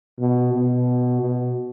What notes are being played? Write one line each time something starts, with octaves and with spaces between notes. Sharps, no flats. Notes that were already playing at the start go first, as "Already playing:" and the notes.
B2
B2
B2